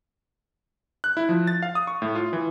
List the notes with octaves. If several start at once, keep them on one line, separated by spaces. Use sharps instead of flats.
F#6
E4
F3
A6
F5
D#6
C#6
A2
F4
E3